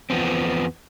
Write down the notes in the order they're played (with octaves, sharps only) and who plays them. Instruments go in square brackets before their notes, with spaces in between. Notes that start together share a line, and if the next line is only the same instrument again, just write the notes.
[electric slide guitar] E2 F3 B3 C4